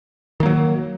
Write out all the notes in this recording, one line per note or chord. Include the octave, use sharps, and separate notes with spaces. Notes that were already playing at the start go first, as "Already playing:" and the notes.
D#3 F#3 A#3